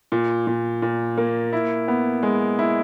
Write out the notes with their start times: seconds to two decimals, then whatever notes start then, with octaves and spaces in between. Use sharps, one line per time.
0.12 A#2
0.47 A#2
0.82 A#2
1.18 A#3
1.53 E4
1.88 B3
2.23 G#3
2.59 E4